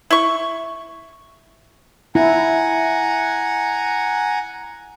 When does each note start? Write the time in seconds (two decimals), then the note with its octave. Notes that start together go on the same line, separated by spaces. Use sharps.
0.11 E4 C#6
2.15 E4 F#5 G#5 A#5